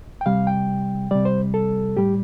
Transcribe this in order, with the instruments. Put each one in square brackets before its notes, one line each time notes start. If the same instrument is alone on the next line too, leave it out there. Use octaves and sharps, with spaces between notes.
[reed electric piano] G5
C3 G3 F5
G5
C3 G3 D5
C5
A4
A2 G3 G4